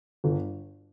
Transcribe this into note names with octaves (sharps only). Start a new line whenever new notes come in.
G1